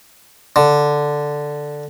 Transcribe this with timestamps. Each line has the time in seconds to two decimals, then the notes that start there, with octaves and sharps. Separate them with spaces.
0.56 D3